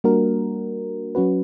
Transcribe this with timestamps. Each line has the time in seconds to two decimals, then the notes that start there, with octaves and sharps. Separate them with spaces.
0.04 G3 A#3 D4 F#4 A#4
1.15 F#3 C#4 F#4 B4